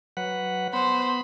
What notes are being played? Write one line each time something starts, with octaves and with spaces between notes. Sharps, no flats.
F#3 B4 F#5
B3 C5 B5